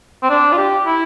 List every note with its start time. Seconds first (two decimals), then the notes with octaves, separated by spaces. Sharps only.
0.23 C4
0.30 D4
0.52 F4
0.58 G4
0.86 E4